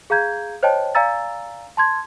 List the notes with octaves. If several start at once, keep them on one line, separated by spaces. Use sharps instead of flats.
G#4 F5 A#5 G6 G#6
C5 C#5 D#5 G5 A5
D5 F5 G#5 A#5 E6 A6
A5 C6 G#6